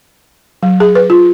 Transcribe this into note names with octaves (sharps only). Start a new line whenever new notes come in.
F#3
G#4
B4
F4